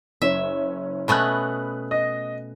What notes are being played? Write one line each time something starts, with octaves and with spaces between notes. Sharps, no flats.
F#1 C#4 E5
B2 A3 C#4 B5 D#6 F#6
D#5